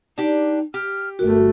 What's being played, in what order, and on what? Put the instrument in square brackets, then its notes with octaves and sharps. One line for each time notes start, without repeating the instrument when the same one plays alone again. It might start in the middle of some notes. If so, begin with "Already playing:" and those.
[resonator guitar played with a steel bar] D4 G4 [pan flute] D#4
[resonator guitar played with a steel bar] G4 [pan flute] F6
[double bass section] G1 A3 [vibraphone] F#4 [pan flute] A#4